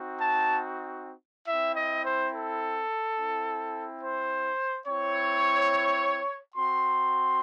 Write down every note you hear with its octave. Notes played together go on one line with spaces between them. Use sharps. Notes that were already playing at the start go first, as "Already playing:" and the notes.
Already playing: C4 D#4 F#4
A5
C4 E4 E5
D#5
C5
A4
C4 E4
C5
C4 E4 C#5
C4 F#4 C6